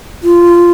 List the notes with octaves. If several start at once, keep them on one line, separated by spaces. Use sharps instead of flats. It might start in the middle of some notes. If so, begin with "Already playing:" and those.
F4